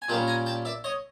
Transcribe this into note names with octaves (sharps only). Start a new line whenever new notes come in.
G#5
A#2 G3 A#3 C#4 G5 A5
G#5 A#5
G5 A5
D5 E5
C#5 D#5